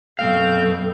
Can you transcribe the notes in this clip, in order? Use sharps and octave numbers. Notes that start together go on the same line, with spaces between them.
F#2 B2 C4 A4 F5 G6